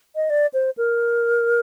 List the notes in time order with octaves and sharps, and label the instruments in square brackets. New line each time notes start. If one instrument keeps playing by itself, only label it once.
[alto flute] D#5
D5
C5
A#4